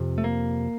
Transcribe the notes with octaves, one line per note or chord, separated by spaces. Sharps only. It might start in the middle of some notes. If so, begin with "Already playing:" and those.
Already playing: F2 C3
A3
A#3